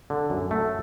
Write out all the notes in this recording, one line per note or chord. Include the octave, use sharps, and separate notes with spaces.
D3
F#2
A3